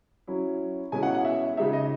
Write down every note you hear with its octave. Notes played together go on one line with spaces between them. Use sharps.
F#3 C#4 E4
B2 G#3 C#4 E4 G#5
F#5
F#5
E5
C#3 G#3 D#4 E5
D#5